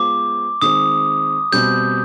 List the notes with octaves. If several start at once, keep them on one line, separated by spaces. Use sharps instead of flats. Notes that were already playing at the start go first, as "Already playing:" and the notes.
Already playing: G#3 B3 F4 C5 D6
D#3 G#3 C4 D#6
B2 G3 C4 G6